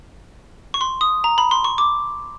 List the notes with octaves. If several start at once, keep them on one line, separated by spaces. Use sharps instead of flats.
C#6
C6
D#6
A#5
B5
C6
C#6
D6